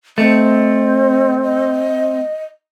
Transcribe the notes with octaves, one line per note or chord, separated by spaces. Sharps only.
A3 C4 D#5
D#5